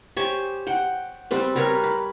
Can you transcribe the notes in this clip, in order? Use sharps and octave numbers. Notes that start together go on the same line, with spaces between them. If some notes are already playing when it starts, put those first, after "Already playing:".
G4 C5 C#5 G#5
F#5 G5
G3 C4 B4
G3 A#4 B4 C#5
B5